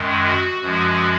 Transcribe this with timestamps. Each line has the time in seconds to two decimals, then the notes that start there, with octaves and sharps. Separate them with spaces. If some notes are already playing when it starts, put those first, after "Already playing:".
Already playing: F#2 D#3 G#3
0.24 F#4
0.61 F#2 F3 G#3 F#4